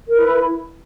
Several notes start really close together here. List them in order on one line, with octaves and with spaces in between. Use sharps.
A#4 B4 E4